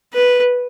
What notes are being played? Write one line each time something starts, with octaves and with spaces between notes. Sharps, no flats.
B4